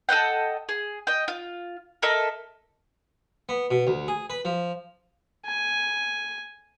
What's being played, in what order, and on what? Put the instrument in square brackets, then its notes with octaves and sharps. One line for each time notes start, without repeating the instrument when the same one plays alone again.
[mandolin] A4 D#5 F#5 G5
G#4
D#5 G5
F4
A4 A#4 D#5 E5
[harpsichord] B3
B2
D2
G#4
B4
F3
[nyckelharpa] G#5